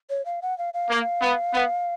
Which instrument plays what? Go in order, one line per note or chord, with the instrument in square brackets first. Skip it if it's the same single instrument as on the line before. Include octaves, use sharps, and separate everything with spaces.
[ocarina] C#5
F5
F#5
F5
F5
[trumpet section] A#3
B3
B3